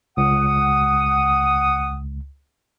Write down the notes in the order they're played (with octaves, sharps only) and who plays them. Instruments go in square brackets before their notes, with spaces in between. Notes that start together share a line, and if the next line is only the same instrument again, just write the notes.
[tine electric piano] C#2 [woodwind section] F#5 D#6